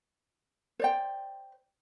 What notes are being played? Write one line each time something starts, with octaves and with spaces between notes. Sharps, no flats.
C5 D5 G5